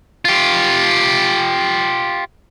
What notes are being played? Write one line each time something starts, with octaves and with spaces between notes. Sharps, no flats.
F4 G4